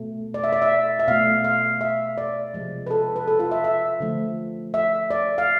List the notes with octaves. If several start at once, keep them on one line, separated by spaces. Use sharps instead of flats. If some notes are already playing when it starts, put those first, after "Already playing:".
Already playing: B2 A3
D5
E5
D5
E5
E5
B2 A3 F5
F5
E5
D5
C3 F3 G#3
B4
A4
B4
A4
F4
E5
E5
D3 F3 A3
E5
D5
F5